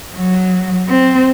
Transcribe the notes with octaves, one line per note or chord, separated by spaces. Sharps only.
F#3
C4